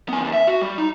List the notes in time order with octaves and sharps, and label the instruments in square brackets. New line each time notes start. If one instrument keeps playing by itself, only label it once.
[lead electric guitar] B3 G#5
D#2 D#3
E5
F#4
G3
D#4